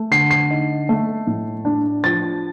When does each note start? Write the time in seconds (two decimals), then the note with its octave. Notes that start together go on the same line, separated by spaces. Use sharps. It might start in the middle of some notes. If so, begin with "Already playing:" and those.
Already playing: A3
0.11 D3 C7
0.31 C7
0.50 D#4
0.89 A3
1.27 A2
1.65 D4
2.04 F3 A6